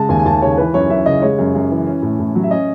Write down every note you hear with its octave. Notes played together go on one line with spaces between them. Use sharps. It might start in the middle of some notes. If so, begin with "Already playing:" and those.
Already playing: C#3 G#3 A5
D#2 G#5
G#5
D#2 A5
C#3 C#5
E3 B4
F#2 C#5
F#2 E5
C#3 D#5
G#3 C#5
F#2
F#2
E3
C#4
A2
A2
F#3
E5
C#4 D#5